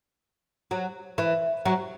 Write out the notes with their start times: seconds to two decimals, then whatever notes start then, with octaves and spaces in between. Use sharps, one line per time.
0.71 F#3
1.18 E3
1.65 F#3